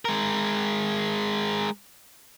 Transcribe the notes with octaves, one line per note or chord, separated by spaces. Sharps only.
G#3 A#4